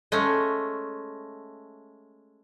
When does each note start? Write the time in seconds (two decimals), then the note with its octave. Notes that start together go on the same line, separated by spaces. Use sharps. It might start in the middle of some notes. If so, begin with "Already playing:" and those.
0.12 G#3 A3 C#4